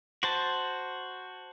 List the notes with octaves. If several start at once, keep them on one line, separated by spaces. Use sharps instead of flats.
F#4 C5 A5